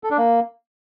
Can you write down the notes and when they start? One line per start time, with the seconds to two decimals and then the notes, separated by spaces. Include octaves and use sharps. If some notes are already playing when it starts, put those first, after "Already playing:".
0.04 A4
0.11 D4
0.18 A#3